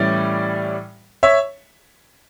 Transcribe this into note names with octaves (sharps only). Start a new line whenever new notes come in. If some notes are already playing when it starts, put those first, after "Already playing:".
Already playing: A2 E3 G3 C#4 E4 D5
C#5 E5